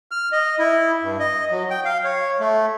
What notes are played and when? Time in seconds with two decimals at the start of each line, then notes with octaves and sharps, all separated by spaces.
0.11 F6
0.32 D#5
0.59 E4
1.02 G2
1.19 D#5
1.51 F#3
1.70 G5
1.85 F5
2.04 C#5
2.40 A3